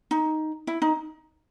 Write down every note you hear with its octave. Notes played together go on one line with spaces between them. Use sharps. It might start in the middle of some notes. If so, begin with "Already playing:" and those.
D#4
E4
D#4